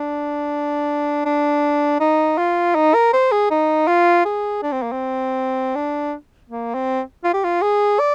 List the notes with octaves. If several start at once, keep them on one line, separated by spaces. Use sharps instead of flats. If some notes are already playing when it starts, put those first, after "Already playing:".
Already playing: D4
D4
D#4
F4
D#4
A#4
C5
G#4
D#4
F4
G#4
D4
C4
A#3
C4
D4
A#3
C4
F4
G4
F4
G#4
D5